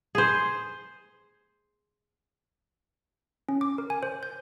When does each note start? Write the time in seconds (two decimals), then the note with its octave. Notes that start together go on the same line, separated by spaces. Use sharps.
0.15 G#4 C5
3.49 C#4
3.61 D6
3.78 A#4
3.90 G#5
4.03 C5
4.23 G6